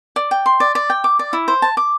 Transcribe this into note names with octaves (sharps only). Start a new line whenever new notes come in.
D5
G5
C6
D5
D5
G5
D6
D5
E4
C5
A5
D6